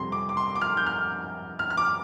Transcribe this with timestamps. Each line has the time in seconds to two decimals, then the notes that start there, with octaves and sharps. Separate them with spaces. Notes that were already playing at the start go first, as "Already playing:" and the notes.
Already playing: F2 C3 G3 C6
0.12 D6
0.29 D6
0.37 C6
0.55 D6
0.62 F6
0.77 G6
0.87 F6
1.59 F6
1.70 F6
1.77 D6